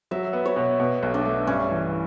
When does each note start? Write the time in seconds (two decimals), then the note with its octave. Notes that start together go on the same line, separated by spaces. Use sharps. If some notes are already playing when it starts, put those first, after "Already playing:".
0.11 F#3 E5
0.33 B3
0.46 C#5
0.56 B2
0.80 B2
1.03 B1
1.14 D4
1.25 A3
1.47 G2 C#4
1.71 E3